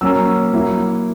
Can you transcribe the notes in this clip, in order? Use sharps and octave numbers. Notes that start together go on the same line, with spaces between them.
F#3 A#3 C#4 E6
F#3 A#3 E4